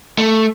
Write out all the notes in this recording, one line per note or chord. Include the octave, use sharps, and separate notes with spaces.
A3